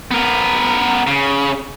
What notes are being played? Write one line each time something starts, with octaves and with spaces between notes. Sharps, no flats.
B3 A#4
C#3